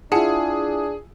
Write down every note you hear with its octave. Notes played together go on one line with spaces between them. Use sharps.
D4 E4 F4 G#4 E5 F#5 A5